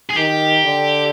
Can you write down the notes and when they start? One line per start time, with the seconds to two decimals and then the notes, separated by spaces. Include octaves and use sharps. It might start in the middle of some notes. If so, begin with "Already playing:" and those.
0.09 G#4
0.16 D#3 G4
0.65 D3